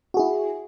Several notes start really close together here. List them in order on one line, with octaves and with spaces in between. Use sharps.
F#4 G#4 E4